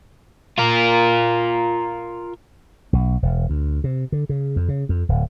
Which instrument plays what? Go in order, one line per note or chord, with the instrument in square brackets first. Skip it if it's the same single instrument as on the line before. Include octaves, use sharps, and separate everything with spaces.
[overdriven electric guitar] F4 A#4
[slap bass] B1
E1
D2
C3
D3
C#3
F2
C#3
F2
D1